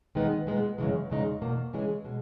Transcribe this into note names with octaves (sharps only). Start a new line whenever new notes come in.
D#3 G#3 B3 D#4
A#2 G#3 B3
F#2 C#3 E3 G#3
E2 C#3 G#3 D#4
E2 B2 A#3
C#3 E3 G#3 C#4 G#4
B2 G#3